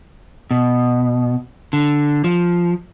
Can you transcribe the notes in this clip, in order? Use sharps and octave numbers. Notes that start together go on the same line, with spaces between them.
B2
D3
F3